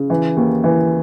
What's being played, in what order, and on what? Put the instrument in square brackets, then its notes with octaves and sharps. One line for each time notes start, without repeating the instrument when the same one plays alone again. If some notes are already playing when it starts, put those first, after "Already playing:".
Already playing: [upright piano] C#3
E3
D#2
E3